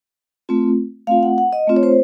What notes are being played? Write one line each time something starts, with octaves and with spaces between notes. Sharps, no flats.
A3 C4 F4
A3 C4 F4 F5
F#5
F#5
D#5
A3 C4 F4
C#5
C5